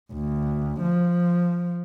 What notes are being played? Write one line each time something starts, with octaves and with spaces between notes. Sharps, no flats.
D2
F3